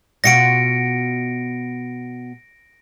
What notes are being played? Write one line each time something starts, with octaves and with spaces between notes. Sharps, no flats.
B2 F4 F#4 A#6 C#7 D7